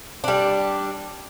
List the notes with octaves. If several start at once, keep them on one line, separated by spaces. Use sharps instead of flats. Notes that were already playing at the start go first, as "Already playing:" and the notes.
G3 D4